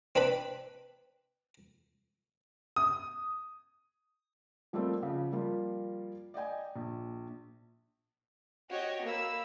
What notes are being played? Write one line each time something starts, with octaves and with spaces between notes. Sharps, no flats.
C4 D4 B4 B5
D#6
F3 G3 A3 A#3 C4
C#3 F3
F3 G3 A#3 F4
D5 D#5 G5 G#5
A#1
F#4 G4 C#5 D#5
A#3 B5 E6